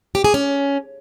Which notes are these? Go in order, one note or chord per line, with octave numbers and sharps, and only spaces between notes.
G4
G#4
C#4